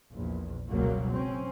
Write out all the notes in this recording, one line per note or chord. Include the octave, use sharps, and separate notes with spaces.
A#1 E2
F#1 C#2 B2 F#3 G3 A#3
C4 C#4